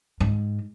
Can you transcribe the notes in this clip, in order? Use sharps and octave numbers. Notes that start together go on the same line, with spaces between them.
G#2